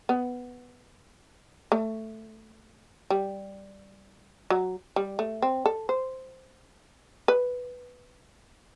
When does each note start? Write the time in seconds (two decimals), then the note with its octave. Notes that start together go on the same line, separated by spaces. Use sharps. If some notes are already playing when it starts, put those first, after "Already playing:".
0.09 B3
1.72 A3
3.10 G3
4.50 F#3
4.96 G3
5.19 A3
5.42 C4
5.66 A4
5.89 C5
7.28 B4